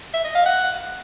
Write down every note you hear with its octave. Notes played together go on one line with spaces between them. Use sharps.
E5
D#5
F5
F#5